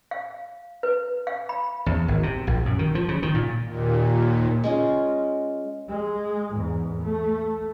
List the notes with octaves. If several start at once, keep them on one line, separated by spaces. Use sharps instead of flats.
F5
B4
F5
B5
E2
G#1
C3
A#1
F#2
D#3
F3
C#3
D#3
A#2
D#2 A#2
G#3 C#4 F4
G#3
E2 G#2
A3